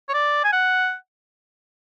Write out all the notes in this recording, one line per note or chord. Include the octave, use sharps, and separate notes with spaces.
C#5
D5
G#5
F#5